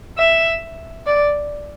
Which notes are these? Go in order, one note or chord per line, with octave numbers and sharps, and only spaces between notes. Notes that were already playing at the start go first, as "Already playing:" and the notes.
E5
D5